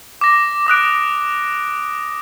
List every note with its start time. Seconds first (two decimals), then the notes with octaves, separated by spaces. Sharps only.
0.21 D6 A#6
0.67 D6 D#6 F#6 D7